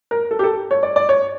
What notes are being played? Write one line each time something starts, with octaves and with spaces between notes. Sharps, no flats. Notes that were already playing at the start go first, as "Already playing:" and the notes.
A#4
A4
G4
A4
C#5
D5
D5
C#5